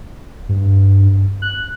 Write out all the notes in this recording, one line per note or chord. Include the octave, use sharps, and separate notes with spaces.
G2
F#6